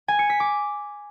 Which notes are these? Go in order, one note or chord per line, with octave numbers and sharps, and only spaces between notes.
G#5
C#7
B6
D6